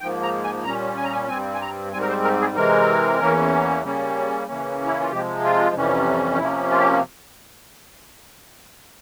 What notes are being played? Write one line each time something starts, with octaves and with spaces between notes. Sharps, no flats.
G#2 F3 A#3 G5
A#5
G#5
A#2 G3 C#4 A#5
G#5
A#5
G#5
G2 G3 C4 G#5
G#5
A#5
G#2 G3 C4 G#5
A#4
C5
A#4
G#4
C3 E3 G#3 C4 A#4
E2 E3 A#3 C#4
C#3 G3 A#3 C#4
C#3 E3 A#3 C#4
E4
F4
C3 F3 G#3 G4
F4
F2 C3 E3 G3 C#4
C3 F3 A#3 C#4 E4
F4
G4